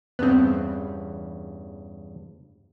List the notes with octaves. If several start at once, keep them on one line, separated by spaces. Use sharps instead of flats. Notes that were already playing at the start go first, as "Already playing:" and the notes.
E2 G2 C#3 B3 C4